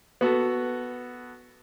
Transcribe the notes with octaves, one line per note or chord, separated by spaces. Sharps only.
B3 F#4 A4